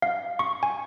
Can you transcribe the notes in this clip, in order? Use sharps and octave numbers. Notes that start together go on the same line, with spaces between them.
F5
C#6
G#5